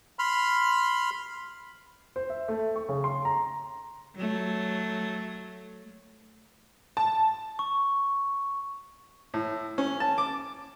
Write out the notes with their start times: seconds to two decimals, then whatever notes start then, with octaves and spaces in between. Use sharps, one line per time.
0.19 B5 C6 F6
2.16 C5
2.30 E5
2.48 A3
2.76 C#6
2.89 C#3
3.04 C6
3.25 A#5
4.15 F#3 A3
6.97 A5
7.59 C#6
9.34 A2
9.78 C#4
10.00 A5
10.18 D6